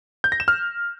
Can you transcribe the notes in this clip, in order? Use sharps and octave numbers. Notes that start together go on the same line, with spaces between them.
G6
A#6
E7
F6